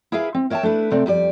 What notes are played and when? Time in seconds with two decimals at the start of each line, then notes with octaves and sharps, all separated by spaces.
0.12 E4 G#4 A#4 B4 E5 F5
0.34 C4
0.50 A#4 C#5 E5 F5 G5 A5
0.63 A3 D4 E4 B4
0.91 C3 A3 C4 D5
1.06 F2 G3 G4 D5